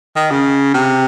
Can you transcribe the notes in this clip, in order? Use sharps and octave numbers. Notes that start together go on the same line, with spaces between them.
D#3
C#3
C3